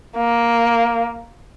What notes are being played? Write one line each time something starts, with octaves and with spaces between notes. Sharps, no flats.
A#3